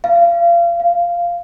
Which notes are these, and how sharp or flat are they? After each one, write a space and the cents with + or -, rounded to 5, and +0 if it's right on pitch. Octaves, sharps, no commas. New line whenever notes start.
F5 -30
F5 -10